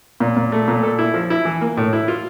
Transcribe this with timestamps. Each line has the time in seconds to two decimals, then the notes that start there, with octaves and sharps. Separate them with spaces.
0.20 A#2
0.37 A#2
0.52 A3
0.68 A#2
0.83 A4
0.99 E4
1.14 F3
1.30 E4
1.45 E3
1.61 A#3
1.77 A2
1.93 E4
2.08 F4